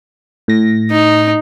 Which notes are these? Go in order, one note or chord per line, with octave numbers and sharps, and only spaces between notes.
A2 A#6
D#4